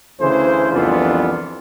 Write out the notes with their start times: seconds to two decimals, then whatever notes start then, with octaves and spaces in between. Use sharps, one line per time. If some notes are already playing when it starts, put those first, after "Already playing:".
0.20 D2 C#3 E3 G#4 C5
0.72 C2 F2 E3 B3 D4 F4